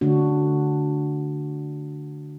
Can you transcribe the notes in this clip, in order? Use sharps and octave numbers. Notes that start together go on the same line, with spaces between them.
D3 A3 D4 F#4